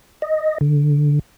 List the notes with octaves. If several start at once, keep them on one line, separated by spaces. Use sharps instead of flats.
D#5
D3